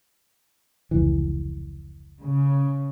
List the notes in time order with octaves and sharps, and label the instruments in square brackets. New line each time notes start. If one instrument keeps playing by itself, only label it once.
[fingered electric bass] F1 C#2 E3
[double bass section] C#3